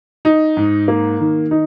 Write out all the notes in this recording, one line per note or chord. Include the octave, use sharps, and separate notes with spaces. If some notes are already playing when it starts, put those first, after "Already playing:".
D#4
G#2
A#3
D#3
D#4